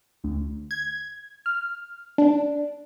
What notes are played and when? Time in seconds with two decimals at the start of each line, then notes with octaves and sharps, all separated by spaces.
0.24 D2
0.71 G#6
1.46 F6
2.18 D4